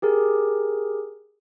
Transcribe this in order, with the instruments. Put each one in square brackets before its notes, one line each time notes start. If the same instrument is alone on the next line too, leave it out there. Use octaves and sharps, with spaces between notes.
[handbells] G4 G#4 A#4